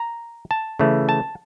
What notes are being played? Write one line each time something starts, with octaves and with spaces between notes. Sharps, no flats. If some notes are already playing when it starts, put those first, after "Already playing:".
Already playing: A#5
A5
C#3 E3 A3
A5